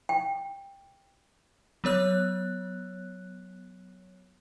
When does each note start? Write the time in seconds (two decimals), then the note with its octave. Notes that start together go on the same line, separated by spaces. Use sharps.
0.09 G5
1.84 F#3 B3 C#5 F#6